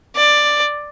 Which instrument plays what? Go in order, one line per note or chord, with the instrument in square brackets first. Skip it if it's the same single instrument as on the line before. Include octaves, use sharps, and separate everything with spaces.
[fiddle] D5